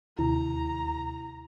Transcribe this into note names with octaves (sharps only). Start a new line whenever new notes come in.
D#2 C3 E4 A#5